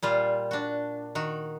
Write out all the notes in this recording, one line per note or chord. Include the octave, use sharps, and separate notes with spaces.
A#2 G3 F4
D4 F#4
D#3 F#4